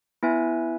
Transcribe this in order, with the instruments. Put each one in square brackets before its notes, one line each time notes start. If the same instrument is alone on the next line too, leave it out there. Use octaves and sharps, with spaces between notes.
[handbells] B3 E4 B4 E5 G#5